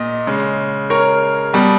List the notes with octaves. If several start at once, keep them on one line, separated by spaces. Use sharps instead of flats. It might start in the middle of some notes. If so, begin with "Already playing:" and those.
Already playing: A#2 D#5
C#3 G#3
A#4 C#5
B2 G3